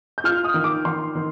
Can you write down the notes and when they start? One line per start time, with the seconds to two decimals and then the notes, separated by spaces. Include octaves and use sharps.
0.18 G6
0.24 F4 F6
0.44 D#6
0.54 D#3
0.64 D6
0.85 D#3 C6
1.15 D#3